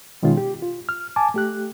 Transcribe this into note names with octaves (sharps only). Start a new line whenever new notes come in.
B2 D#3 G#3 C#4 F4
G4
F4
F6
G#5 A5 D6
A3 G4 F#6